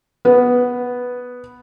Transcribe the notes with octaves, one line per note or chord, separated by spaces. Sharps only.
B3 B4